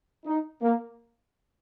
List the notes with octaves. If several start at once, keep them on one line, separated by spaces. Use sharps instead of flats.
D#4
A#3